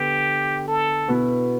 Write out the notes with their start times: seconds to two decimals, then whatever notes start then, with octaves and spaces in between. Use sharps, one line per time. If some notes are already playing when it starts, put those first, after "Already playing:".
Already playing: D3 B3 G4
0.68 A4
1.08 B2 B3 E4